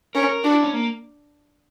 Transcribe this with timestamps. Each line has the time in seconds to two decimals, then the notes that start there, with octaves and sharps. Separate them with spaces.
0.15 C#4 A#4
0.29 A#4
0.44 D4 F#4
0.54 E4
0.63 C#4
0.73 A#3